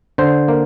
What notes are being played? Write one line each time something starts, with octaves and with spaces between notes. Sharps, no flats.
D3 C5
A#3